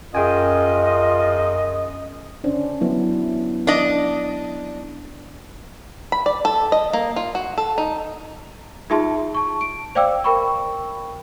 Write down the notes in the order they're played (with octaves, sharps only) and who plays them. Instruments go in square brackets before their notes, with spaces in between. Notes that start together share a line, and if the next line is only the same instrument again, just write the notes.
[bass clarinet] F#2 [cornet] F4 [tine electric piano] G#4 G5 G#5 [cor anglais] D#5
[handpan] C#4 D4 C5
F#3 B3 E4
[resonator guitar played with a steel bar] D4 D#5
[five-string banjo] B5
D5
A4
D#5
A#3
F4
F#4
A4
D#4
[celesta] D#4 F4 G#4 E5 A5 C6
A5 C#6
D7
C5 D5 F5 G5 D6 E6
A#4 G5 B5 C#6